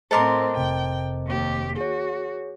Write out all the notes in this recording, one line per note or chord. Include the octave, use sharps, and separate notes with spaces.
A2 C4 A4 A#4 C5 D#5 C6 D6
F1 C3 G5
D#2 G4
F#4 G#4 C#5